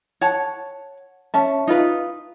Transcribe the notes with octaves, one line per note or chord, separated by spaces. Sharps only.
C#5 F#5 A5
C#4 E5 A5
D#4 F4 B4